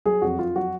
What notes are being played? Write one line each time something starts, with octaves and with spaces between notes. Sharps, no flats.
F#3 G#4
F2 F#4
F2 F4
F#3 F#4